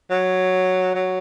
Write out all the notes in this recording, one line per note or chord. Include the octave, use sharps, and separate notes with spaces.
F#3
F#3